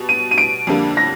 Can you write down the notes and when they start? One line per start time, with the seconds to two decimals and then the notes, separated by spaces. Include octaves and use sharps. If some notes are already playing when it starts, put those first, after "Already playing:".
Already playing: B2 G3
0.09 D#7
0.31 D#7
0.38 D7
0.67 F2 D3 G3 A#3 D4
0.97 A#6